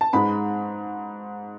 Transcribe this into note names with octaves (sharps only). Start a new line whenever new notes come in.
A5
G#2 G#3 B5